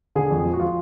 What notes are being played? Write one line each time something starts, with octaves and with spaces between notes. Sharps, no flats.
D3 G#4
F2
F3
F#4
F4